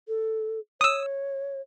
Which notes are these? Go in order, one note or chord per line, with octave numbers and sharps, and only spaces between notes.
A4
C#5 D#6 E6